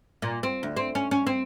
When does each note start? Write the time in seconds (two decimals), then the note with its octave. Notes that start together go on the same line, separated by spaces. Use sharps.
0.22 A#2
0.43 C4
0.63 D2
0.77 C4
0.95 C#4
1.11 C#4
1.27 C4